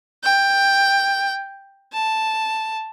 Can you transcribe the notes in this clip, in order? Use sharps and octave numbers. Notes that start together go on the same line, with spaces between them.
G5
A5